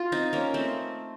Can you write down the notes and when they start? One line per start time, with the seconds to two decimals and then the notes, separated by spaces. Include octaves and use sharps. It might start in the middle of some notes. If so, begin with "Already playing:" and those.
Already playing: F4
0.12 C4 D#4
0.33 A#3 C#4
0.54 A3 C4